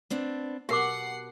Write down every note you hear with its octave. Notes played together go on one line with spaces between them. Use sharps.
B3 C4 D4
B2 G4 A#4 F#5 D6 C7